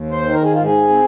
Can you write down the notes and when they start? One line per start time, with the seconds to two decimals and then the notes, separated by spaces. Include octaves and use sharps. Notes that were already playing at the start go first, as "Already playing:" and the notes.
Already playing: D#2
0.11 C5
0.22 D#3
0.33 A#4
0.43 G#4
0.53 G#2 F4
0.63 G#4
0.89 C4